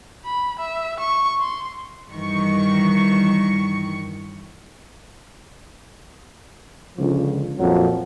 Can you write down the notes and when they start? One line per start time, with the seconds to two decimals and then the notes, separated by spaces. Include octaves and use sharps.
0.25 B5
0.59 E5
1.00 C#6
1.41 C6
2.11 G2 D#3 E3 C#6
6.98 C#2 D3 F3
7.59 F2 A#2 F3 F#3